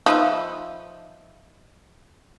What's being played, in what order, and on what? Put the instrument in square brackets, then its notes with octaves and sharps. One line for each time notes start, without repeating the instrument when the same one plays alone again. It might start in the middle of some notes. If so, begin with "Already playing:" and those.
[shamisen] F3 [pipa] D#4 B4 E5